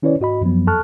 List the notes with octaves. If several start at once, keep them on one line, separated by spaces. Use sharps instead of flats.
D#3 C#4 E4 B4 C#5 D5
G#2 F#4 D#5 B5
F#2 F3 F#3 B3
F2 A4 A5 C#6 F6 F#6